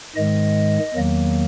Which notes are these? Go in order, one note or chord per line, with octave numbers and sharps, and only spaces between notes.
G#2 D#3 G#3 D#5
E2 D#3 F#3 A#3